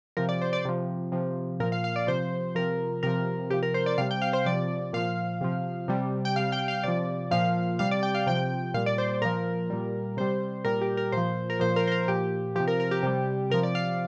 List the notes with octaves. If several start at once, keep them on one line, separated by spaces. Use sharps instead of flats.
C3 F3 A#4
D5
C5
D5
C3 F3
C3 F3
A#2 F3 A#4
F5
F5
D5
C3 F3 C5
C3 F3 A#4
C3 F3 A#4
C3 F3 G4
A#4
C5
D5
C3 G3 F5
G5
F5
C5
C3 F3 D5
A#2 F3 F5
C3 F3
C3 G3
G5
C3 G3 F5
G5
F5
C3 F3 D5
A#2 F3 F5
C3 G3 F5
D5
G5
F5
C3 F3 G5
A#2 G3 F5
D5
C5
A#2 F3 A#4
A#2 G3
C3 G3 C5
A#2 G3 A#4
G4
A#4
A#2 F3 C5
A#4
A#2 F3 C5
A#4
C5
A#4
A#2 F3 G4
C3 F3 G4
A#4
A#4
G4
C3 G3
C3 F3 A#4
D5
F5